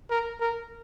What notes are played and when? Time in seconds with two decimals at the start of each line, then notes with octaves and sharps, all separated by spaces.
0.11 A#4
0.41 A#4